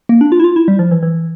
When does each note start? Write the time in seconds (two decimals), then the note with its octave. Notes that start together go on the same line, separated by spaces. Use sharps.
0.09 A#3
0.21 D4
0.32 F4
0.40 E4
0.44 F4
0.56 E4
0.68 G3
0.79 F3
0.91 E3
1.03 E3